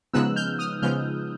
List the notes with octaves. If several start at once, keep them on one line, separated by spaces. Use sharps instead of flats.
C#3 F3 G#3 B3 D#4 E6 F#6
F6 G6
D#6 F6
C#3 F3 G#3 B3 F6 G6